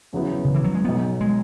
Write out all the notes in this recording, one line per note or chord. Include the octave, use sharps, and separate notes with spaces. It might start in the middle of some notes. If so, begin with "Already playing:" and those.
E2 C#3 F#3 B3 E4
C#3
E3
F#3
G#3
B1 B2 F#3 B3
G#3